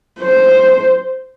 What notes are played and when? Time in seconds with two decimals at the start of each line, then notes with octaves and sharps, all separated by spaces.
0.20 C5